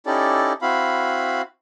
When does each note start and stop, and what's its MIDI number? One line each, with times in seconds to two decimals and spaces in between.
0.06 0.53 61
0.06 0.53 63
0.06 0.53 64
0.06 0.53 67
0.06 0.53 69
0.06 0.53 74
0.62 1.42 60
0.62 1.42 64
0.62 1.42 66
0.62 1.42 77
0.62 1.42 83